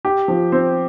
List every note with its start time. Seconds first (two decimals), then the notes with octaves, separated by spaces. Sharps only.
0.05 G4
0.28 F3
0.52 C4